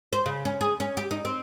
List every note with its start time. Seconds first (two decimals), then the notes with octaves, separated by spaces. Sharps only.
0.13 C5
0.26 C#3
0.45 C#4
0.61 G#4
0.80 C#4
0.97 G4
1.11 D#4
1.25 C4